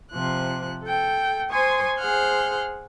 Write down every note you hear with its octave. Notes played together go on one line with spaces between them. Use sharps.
C3 F3 F#6
A4 G5
C5 G#5 C6 C#6 D#6
G#4 C5 F#5 F6 G6